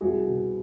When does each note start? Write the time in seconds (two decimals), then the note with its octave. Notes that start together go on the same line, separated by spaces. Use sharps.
0.01 C2 F#4 G#4
0.27 B2